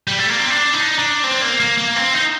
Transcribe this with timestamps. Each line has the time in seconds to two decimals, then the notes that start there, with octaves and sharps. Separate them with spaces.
0.08 G3
0.19 A3
0.29 A#3
0.39 C4
0.50 D4
0.74 D#4
0.99 D4
1.23 C4
1.41 A#3
1.60 A#3
1.78 A#3
1.96 C4
2.14 D#4